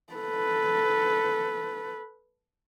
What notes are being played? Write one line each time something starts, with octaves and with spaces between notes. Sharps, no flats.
A4 B4